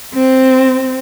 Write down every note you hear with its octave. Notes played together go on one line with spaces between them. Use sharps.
C4